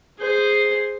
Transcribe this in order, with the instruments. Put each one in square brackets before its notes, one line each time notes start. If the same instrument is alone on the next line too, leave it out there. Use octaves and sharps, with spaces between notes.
[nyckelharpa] G#4 C5